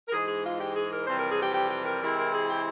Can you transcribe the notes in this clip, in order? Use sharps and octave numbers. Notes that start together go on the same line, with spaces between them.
A#4
G#2 E3 G#3 G#4
G#4
F4
G4
G#4
A#4
F2 C3 E3 G3 C4 C5
A#4
G#4
G4
G4
G4
A#4
C3 E3 G#3 C4 E4 A#4
A#4
G#4
G4